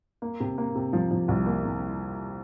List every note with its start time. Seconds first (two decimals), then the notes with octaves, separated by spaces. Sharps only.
0.22 A#3
0.40 C3
0.58 A#3
0.75 C3
0.93 F3
1.11 F3
1.28 C2
1.46 A#3
1.65 C3